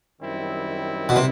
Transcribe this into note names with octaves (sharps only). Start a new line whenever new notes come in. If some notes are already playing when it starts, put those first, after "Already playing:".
F#2 D#3 G3 C4 E4
B2
C3